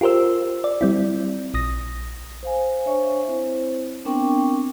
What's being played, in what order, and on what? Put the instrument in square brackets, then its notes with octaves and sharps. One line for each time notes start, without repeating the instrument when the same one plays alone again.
[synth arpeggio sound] F4 G4 A#4 C5 E6
D5
G3 C4 E4
A#1 D#6 A#6
[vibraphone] C5 F5 G#5
D4 C5 C#5 E5 G#5 C#6
C4 E4 C5
B3 C4 D4 A#4 G5 C#6